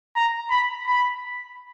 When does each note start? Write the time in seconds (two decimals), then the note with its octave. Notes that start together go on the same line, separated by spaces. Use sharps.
0.16 A#5
0.50 B5
0.86 B5